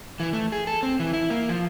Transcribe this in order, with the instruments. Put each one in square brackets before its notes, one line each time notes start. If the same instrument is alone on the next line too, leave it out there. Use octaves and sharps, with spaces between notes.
[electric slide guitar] E3
A3
G#4
A4
C4
E3
E4
A#3
F3